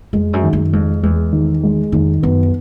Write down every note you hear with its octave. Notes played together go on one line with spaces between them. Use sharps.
F2 G#3
F#2
D#3
F#2
F2 G#3
E2 G#3
D#3
G#3
F2 D#3
F#2 B3